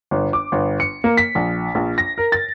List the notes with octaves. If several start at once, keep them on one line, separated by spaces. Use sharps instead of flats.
G1
D6
G1
C#7
A#3
B6
A#1
A#1
A#6
A#4
A6